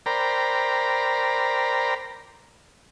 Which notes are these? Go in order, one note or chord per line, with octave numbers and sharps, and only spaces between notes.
A#4 C5 D5 G5 A#5 B5